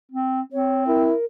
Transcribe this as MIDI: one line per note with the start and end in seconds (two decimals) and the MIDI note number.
0.12 0.41 60
0.53 1.10 60
0.53 0.84 73
0.87 1.14 64
0.87 1.25 70